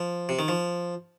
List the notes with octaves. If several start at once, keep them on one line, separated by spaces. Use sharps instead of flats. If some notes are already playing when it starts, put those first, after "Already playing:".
Already playing: F3
C3
D#3
F3